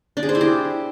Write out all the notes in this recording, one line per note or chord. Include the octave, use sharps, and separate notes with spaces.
D4
G#4
C5
E4
G4